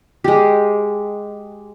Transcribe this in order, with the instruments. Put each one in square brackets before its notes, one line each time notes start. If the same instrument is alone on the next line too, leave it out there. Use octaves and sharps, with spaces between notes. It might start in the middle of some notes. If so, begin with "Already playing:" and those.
[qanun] G#3 G4